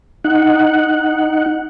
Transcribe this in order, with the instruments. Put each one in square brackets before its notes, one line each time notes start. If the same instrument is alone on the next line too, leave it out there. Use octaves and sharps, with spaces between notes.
[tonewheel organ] D#4 F#5